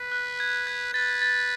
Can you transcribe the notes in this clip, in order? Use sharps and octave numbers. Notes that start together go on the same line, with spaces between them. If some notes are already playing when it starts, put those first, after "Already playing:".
Already playing: B4
F#6
G#6
G#6
B4 A6
A6